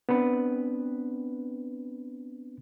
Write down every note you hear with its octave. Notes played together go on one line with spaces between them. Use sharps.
B3 C4 D4 B4